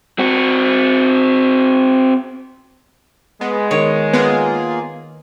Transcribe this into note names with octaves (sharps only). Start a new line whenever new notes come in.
C4 F#4
G#3 B3
D#3 C#5
A#3 B3 F4 G#4